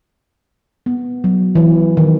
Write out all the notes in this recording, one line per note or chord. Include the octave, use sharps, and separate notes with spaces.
B3
F#3
E3
D#3